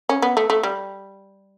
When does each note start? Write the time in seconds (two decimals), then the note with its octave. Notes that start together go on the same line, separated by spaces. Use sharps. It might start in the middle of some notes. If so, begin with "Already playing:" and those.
0.09 C#4
0.22 B3
0.37 A3
0.50 A3
0.63 G3